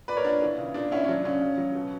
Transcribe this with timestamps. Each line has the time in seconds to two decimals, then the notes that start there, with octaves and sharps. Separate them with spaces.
0.08 A#2 B4 D5
0.17 A#4 C#5
0.24 A#2 D4
0.42 E3
0.58 C#3
0.74 A#2 D4
0.92 A#2 C#4 E4
1.04 C#4
1.08 F#3 D4
1.25 C#3 C#4
1.41 C#3
1.58 F#3
1.75 B2